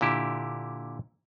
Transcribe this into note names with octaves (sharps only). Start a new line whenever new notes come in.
A#2 D3 E4 G4